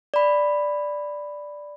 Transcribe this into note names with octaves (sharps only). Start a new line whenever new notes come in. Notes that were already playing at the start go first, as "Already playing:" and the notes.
D5 B5